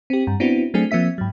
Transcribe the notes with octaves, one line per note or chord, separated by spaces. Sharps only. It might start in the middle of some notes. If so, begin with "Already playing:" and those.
C4 G4
G2
B3 C4 D4 E4 F#4
F#3 A3 C4 D4 G#4
F3 A#3 C4 E5 B6
G#2 F#3